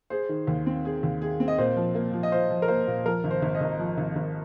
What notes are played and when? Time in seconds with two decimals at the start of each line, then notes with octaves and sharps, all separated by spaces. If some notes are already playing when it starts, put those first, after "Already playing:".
0.10 G#4 C5
0.29 D#3
0.47 D#2
0.66 C4
0.85 G#4
1.03 D#2
1.22 G#4
1.40 C4
1.48 D#5
1.58 A#2 C5
1.77 F3
1.95 A#3
2.13 F3
2.23 D#5
2.32 F4 C5
2.50 F3
2.62 A#4
2.68 A#3 C5
2.87 A#2
3.06 F3 A#4
3.24 G#1
3.31 C5
3.42 G#1
3.55 D#5
3.61 G#1
3.79 F3
3.98 G#1
4.16 G#1